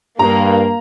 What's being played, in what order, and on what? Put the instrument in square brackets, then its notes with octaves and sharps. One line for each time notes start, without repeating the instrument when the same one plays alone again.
[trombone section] G2 [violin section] A#3 [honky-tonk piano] A#5